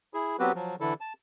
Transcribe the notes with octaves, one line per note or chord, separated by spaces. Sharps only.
E4 G#4
F#3 B3 C4 F#4 G4 B4
F3 F#3
D3 E3 E4 A4
A5